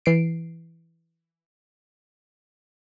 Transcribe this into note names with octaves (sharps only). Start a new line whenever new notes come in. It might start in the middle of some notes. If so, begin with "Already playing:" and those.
E3 C7 D7